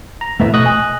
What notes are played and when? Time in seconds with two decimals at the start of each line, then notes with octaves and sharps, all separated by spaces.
0.21 A#5
0.40 E2 A2 A3 B3 E5
0.54 B2 A3 D#5 D#6 F#6
0.66 G#5